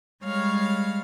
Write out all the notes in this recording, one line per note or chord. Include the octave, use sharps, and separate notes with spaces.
G3 G#3 C#5 F5 F6